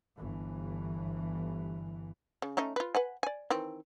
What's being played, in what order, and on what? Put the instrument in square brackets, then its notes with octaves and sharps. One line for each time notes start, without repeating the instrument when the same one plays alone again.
[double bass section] G1 E3
[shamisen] C#3
A3 C#4 D#4
F4 B4
B4 F#5 G#5
D5 G#5
D#3 E3 C4